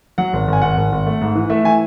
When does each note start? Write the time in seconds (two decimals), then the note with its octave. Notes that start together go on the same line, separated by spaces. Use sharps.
0.18 F#3 F#5
0.33 G#1
0.48 G#1
0.53 G#5
0.62 G#1 F#5
0.77 G#1
0.92 G#1
1.07 A3
1.21 G#2
1.35 E3
1.50 A3 E5
1.64 E3 G#5